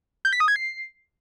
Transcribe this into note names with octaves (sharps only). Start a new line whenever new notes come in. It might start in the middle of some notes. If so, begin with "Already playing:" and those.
G6
B6
D#6
G#6
C7